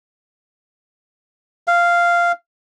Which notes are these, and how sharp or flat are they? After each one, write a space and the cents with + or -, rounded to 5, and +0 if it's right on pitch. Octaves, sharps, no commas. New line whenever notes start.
F5 -10